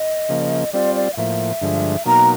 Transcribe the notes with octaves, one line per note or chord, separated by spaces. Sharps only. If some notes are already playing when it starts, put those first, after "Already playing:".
Already playing: D#5
C#3 F3 A#3
G3 C4 F4 D5
D5
F5
A2 F3 A#3 E5
G2 D3 F3 G#3
B2 F#3 A#3 D#4 A#5